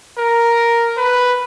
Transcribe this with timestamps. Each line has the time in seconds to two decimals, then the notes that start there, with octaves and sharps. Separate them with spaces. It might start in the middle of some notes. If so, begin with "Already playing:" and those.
0.18 A#4
0.97 B4